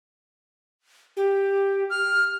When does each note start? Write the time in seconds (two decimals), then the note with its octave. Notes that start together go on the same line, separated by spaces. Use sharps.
1.17 G4
1.90 F6